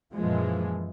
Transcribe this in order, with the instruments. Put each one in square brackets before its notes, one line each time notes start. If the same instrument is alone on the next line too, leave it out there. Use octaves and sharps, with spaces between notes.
[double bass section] F#2 A#2 E3 F3 G#3